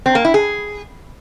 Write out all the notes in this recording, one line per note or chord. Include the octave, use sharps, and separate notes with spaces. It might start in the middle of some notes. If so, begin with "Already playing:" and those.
C4
A#3
E4
G#4